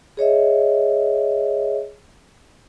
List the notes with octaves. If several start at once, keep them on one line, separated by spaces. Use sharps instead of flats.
G#4 C#5 D#5 E5